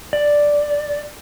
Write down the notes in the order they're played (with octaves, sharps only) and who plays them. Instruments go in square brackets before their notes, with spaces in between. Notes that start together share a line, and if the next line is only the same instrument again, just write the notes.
[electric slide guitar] D5